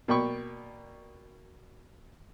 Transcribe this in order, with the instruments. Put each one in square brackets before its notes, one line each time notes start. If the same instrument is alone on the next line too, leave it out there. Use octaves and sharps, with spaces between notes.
[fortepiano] B2 A#3 D5 G5 B5 C#6